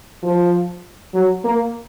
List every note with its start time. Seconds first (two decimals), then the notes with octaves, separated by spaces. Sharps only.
0.23 F3
1.14 F#3
1.44 A#3